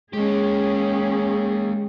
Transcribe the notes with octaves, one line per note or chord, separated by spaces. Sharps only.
G#3 A#3 C#4 G4 G#4